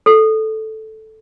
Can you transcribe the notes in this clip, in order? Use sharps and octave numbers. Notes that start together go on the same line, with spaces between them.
A4